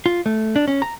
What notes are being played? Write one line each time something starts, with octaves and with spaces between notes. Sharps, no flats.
F4
A3
D4
C#4
A#5